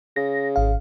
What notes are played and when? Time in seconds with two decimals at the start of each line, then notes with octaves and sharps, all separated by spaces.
0.16 C#3 A#6
0.56 G#1 F5